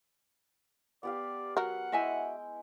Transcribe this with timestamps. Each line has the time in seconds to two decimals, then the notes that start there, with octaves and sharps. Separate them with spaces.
1.03 B3 G4 D5 F5
1.57 F#3 A#4 F#5
1.92 G#3 E4 F#4 E5 G5 G#5